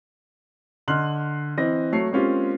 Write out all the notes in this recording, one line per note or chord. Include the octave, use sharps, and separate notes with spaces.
D3 D#5 C6 F6 F#6 F#7
E3 C4 D#5 A#6
F#3 A3 C#5 C7
G#3 A#3 C4 C#4 F4 G4